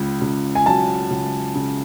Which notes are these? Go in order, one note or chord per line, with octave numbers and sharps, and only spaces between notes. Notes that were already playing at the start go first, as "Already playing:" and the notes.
Already playing: C#2 C#3
C#2
G#5
F#3 A5
C#2
C#3